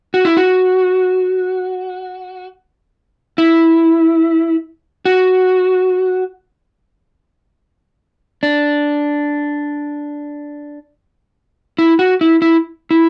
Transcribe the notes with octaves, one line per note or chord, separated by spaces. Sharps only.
F#4
E4
F#4
E4
F#4
D4
E4
F#4
E4
E4
E4